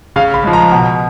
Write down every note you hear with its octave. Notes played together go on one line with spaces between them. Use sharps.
C#3 F5
B5
F3 G#3
A#5
B2